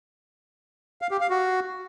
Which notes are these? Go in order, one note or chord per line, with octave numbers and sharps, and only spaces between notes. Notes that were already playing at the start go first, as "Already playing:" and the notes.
F5
G4
F5
F#4